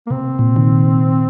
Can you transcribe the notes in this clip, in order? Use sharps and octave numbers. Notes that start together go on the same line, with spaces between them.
A#3
C3 C4
A#2
D#3